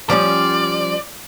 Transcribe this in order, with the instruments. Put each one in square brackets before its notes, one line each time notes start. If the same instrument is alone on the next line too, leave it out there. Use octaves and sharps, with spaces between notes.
[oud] F3 G3 C#4 [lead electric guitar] D5